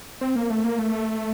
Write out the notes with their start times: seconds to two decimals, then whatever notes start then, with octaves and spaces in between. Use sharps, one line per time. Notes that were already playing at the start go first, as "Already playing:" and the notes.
0.21 C4
0.36 A#3
0.50 A3
0.64 A#3
0.79 A3